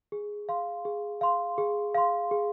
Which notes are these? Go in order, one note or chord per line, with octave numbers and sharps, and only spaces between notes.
G#4
F5 C6
G#4
F5 C6
G#4
F5 C6
G#4